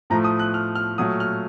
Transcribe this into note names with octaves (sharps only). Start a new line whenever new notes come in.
A2 F3 A3 A#5
D#6
F#6
F6
F6
A#2 F#3 A3 D#6
F6